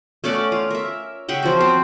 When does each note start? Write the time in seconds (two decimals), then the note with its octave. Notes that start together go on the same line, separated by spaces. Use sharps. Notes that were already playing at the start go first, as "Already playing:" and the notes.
0.24 A3 C#4 D5 F#5
0.52 F4
0.71 A#4 E5
1.28 C#3 E5 F#5 G5
1.43 F3 C4 F#4
1.61 C4